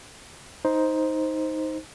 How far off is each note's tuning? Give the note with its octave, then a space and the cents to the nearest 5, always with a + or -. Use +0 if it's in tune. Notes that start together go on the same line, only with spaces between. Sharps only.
D#4 +10 C5 +0